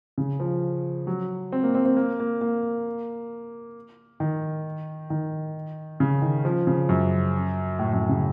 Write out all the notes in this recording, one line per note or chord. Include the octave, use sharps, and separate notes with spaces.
C#3
F3
F#3
C4
A#3
C4
C4
A#3
A#3
A#3
D#3
D#3
C#3
D#3
F3
C#3
F#2
A2
F#2
C#3